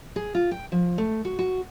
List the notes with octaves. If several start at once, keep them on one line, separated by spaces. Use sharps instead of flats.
G#4
F4
G5
F3
A3
F#4
F#4